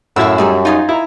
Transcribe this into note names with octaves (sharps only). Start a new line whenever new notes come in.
F#2 A2 E4 F5 F#5 E6
G3 D#4 G#4 G#5
D#4 F4 G#5 D#6
E4 A#5